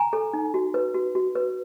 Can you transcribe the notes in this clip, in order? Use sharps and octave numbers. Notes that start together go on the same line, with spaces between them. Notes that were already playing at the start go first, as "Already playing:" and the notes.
Already playing: G#5 A#5
A4
D#4
F#4
B4
F#4
F#4
B4